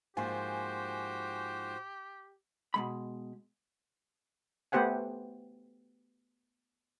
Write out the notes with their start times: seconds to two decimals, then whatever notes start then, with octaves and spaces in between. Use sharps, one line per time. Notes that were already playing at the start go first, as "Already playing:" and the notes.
0.17 G#2 F3 A#3 F#4 G4 C5 G#5 C6
2.74 B2 G#3 B5
4.72 A3 B3 G4 C5 F#5 G#5